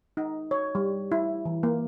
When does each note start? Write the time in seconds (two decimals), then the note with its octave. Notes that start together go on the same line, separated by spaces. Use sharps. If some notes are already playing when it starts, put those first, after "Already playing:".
0.17 D#4
0.51 C#5
0.75 G3
1.12 E4
1.45 E3
1.63 A#3